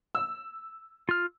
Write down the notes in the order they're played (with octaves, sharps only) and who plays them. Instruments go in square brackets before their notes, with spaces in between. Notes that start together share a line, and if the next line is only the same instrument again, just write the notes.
[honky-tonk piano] E6
[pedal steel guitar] F4 F6